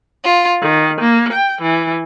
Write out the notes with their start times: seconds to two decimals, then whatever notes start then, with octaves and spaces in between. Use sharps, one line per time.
0.24 F4
0.60 D#3
1.00 A#3
1.31 G5
1.61 E3